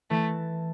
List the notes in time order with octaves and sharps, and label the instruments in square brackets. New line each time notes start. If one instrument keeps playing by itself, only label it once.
[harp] E3 E4 [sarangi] A3